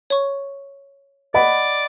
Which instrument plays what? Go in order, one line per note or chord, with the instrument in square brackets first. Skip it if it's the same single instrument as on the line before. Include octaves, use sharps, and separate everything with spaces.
[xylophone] C#5 C#6
[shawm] D5 [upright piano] D#5 F#5 B5